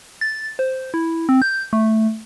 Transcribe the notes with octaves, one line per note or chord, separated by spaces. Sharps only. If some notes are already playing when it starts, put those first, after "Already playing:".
A6
C5
E4
C4
G6
A3